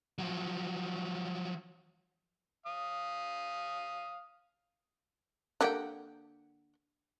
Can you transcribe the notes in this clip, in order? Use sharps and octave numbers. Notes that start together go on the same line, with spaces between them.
F3 F#3
F5 D#6
D3 A#3 G4 F#5 G5